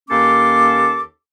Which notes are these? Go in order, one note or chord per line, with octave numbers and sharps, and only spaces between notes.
D#2 A#3 C#4 A4 C6 D6